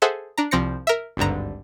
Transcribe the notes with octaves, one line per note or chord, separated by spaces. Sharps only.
G#4 A4 C5 E5 F#5
D4 A#5
C2 F3 C4 A#6 C#7
A#4 E5
G#1 D2 G2 D3 A#5